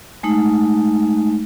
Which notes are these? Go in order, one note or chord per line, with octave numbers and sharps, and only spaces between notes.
G#3 A3 D#4